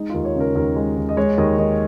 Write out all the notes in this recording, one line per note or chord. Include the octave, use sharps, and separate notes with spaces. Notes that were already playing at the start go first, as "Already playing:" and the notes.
Already playing: G#3 D#4
D#2 F4
C#5
C#3 A#4
D#2 A#4
G#3
D#2
D#5
G#3 C#5
D#2 D#5
D#3 D#5